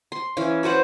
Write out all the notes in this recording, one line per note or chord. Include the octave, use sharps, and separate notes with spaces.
C6
E3 C#4 F5
F#4 B4 C5 F#5